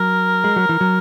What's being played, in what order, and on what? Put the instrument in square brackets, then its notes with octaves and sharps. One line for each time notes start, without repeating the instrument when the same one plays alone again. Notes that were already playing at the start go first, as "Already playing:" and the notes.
Already playing: [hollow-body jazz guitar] F#3 [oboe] A#4
[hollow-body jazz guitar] G#3
F#3
E3
F#3